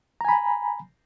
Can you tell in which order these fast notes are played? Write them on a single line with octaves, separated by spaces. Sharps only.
A#5 G#5 B5